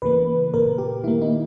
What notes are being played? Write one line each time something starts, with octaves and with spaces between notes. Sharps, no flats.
C#3 E3 A#3 B4
A#2 A#3 A#4
G4
D#3 A#3 E4
D#4